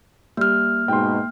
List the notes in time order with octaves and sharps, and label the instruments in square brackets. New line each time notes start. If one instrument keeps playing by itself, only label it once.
[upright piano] G3 [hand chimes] A#3 F6
[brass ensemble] G#2 B2 [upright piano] G5 C6